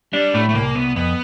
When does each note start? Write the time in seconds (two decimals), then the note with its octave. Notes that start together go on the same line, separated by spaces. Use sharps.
0.13 G3 D4
0.34 A2 A3
0.49 A3
0.55 C2 A#3
0.75 C2 B3
0.96 F2 B3